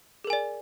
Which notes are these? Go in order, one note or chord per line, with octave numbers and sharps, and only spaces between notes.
G#4 A#4 D5 G#5